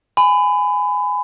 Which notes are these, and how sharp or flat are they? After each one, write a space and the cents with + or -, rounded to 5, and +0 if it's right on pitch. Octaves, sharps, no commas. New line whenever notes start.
G#5 +0 B5 +30